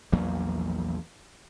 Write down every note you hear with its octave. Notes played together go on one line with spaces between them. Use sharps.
A#1 E2 F#3 A#3